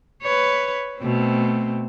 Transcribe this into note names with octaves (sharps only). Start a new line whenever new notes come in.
B4 C#5
B2 A3 C4